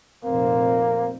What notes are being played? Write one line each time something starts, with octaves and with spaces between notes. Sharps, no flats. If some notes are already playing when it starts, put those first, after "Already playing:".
F1 A#2 A#3 C4